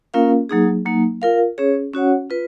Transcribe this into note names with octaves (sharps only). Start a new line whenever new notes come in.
A#3 C#4 F4 A#4 F5
F#3 A#3 D#4 G#4
F#3 A#3 D#4
F4 A#4 F5
C#4 G#4 C#5
C#4 F#4 C#5 F#5
F4 B4